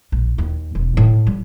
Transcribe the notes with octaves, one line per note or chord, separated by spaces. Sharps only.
A#1
D#2 D#4
E1
A2
G3